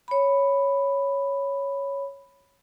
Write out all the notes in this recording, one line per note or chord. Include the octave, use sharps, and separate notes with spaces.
C#5 B5